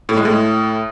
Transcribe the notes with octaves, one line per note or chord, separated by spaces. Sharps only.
A2
G#3
A2